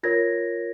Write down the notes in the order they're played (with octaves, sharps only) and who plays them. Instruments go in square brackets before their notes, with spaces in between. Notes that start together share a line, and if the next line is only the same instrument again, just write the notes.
[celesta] F4 A#4 C#5 G#6 A#6